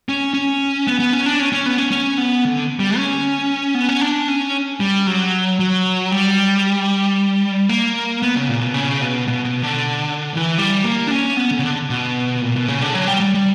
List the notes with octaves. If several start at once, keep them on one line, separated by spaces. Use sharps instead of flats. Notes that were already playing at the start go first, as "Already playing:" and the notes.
C#4
C#4
B3
B3
C#4
D4
C#4
C#4
B3
C#4
C#4
B3
D3
G3
C#4
B3
C#4
D4
C#4
G3
F#3
F#3
G3
A#3
B3
C#3
A#2
B2
C#3
B2
B2
B2
D3
E3
G3
A#3
D4
C#4
B3
D3
C#3
D3
B2
A#2
B2
C#3
D3
F#3
G3
G3
G3